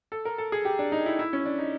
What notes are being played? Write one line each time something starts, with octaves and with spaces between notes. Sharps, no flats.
A4
A#4
A4
G#4
G4
D4
D#4
E4
E4
C#4
D4
D#4